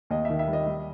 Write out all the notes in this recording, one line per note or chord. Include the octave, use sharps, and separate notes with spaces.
D#2 D#5
D#3 E5
E5
G3
D#5
G3